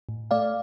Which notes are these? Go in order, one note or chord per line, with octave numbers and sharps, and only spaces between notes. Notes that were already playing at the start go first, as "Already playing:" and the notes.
A2
A3 D5 F5